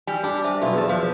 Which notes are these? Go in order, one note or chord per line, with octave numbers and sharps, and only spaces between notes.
G3 G#5
G3 D4
C5 E5
B1 F4 E5
E2 A5
F3 C5